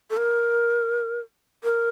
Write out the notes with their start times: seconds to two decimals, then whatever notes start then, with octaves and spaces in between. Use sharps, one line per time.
0.10 A4
0.17 A#4
1.64 A#4